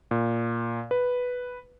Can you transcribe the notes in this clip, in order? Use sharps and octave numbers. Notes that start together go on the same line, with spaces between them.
A#2
B4